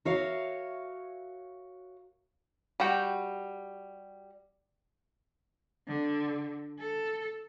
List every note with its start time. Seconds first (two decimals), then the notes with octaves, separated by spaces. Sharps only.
0.05 F#4 A#4 C#5 E5 F5
2.80 G3 F#4 G5
5.87 D3
6.79 A4